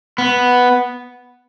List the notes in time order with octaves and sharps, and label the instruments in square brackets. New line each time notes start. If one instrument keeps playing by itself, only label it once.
[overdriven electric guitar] B3